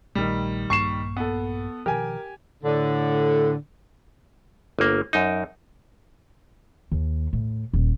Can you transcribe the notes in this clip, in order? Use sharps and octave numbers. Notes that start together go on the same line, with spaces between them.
A#1 A#2 D#3 G3 A3
A#1 G2 A#3 C#6 C7 E7
B3 A4
B2 D#3 F3 G4 A#4 G#5
A2 D3
G1 A#3
F#2 D#4
D#2
A2
D#1